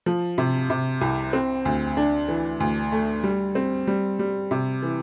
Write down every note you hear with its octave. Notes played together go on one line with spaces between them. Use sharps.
F3
C3
C3
C2
C4
D2
D4
E3
D2
A3
G3
C4
G3
G3
C3
E3